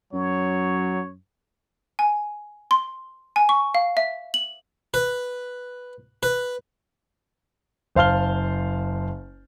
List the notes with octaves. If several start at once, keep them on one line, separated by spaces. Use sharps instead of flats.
F#2 F#3 C#5
G#5
C6
G#5
C#6
F5
E5
F#7
B4
B4
F#1 C5 F5 A5 F6 G7